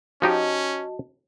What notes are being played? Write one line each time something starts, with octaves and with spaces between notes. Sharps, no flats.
F3 C#4 D#4 F#4 G4 D#5 A5